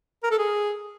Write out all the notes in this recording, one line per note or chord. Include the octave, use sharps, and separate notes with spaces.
A#4
A4
G#4